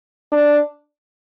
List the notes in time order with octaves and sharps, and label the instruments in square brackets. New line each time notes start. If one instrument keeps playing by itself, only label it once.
[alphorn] D4